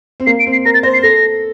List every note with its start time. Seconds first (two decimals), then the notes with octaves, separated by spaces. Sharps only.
0.20 C4
0.26 A#3 C7
0.39 D7
0.46 C4
0.52 C7
0.65 A#4 A#6
0.74 A6
0.83 C5 A#6
0.94 C7
1.03 A4 A#6